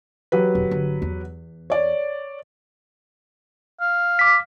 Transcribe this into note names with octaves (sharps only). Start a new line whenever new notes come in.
F#3 G4 B4
E1
G1
E2
C#5 D5
F5
D6 B6